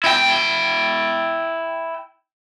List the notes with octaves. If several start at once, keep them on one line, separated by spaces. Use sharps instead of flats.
E4 G5